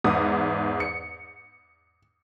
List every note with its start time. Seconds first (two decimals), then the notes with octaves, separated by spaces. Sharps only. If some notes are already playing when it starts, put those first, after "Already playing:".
0.04 E2 G#2 F#5 D#6
0.80 C#7